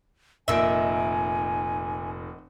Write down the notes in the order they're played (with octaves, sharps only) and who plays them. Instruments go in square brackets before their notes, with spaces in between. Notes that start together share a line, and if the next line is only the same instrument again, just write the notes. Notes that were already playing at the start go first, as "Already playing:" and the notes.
[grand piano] F1 A#2 D7 [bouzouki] D#3 E5 [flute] G#5